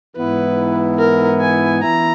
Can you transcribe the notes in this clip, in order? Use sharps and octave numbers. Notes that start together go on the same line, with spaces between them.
G#2 E3 B3 E4 B4
A#4
G#5
E3 B3 E4 A#5